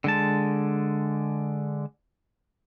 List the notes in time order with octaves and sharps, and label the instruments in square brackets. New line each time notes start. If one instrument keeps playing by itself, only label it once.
[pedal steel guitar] D3 G#3 A5